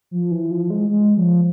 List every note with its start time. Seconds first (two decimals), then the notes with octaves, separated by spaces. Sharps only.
0.11 F3
0.31 E3
0.51 F3
0.70 G#3
0.90 G#3
1.17 F3